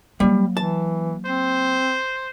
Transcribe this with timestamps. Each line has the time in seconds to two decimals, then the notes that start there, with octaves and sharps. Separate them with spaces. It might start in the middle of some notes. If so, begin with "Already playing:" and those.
0.20 F#3 G3 A#3
0.57 E3 A5
1.26 C4 C5